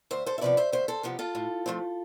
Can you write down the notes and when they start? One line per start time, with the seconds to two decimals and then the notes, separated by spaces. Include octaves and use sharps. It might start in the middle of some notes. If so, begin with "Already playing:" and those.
0.11 D2 C5 E5
0.26 A4 C5
0.38 E5
0.41 C3 F3 B3 B4 D5
0.57 C5 E5
0.72 D2 C5 E5
0.88 A4 C5
1.03 C3 F3 B3 G4
1.19 F4 A4
1.35 A2
1.66 F3 A3 C4